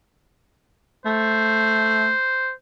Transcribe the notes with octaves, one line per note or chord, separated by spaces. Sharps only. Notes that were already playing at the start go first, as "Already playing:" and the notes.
A3 C5